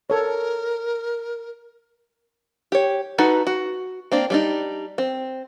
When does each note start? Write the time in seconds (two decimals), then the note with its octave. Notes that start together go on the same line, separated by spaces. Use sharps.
0.10 A4 A#4 C#5
2.72 G4 C#5
3.18 D#4 F#4 A4 B4
3.47 F#4
4.12 A#3 C4 D4
4.30 G3 D4 D#4
4.98 C4